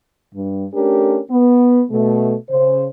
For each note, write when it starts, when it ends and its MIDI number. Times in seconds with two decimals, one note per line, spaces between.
0.35 0.66 43
0.74 1.19 57
0.74 1.19 61
0.74 1.19 62
0.74 1.19 67
0.74 1.19 70
1.30 1.83 59
1.91 2.35 47
1.91 2.35 57
2.49 2.87 49
2.49 2.87 72